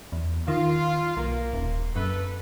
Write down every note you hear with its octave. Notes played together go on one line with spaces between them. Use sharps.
E2
D#3 F4
B1 A#3
D#1
F#2 A4 B4